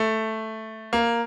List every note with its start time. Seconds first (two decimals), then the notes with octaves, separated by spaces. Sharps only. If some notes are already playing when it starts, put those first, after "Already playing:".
Already playing: A3
0.93 A#3